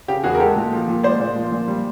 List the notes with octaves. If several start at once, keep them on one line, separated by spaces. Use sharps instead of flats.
C#3 G4
E2 F#4 G#4
A#4
G#3 G4 A4
A#2
F3
A#2
G#3 C5 D5
A#2
F3
A#2
G3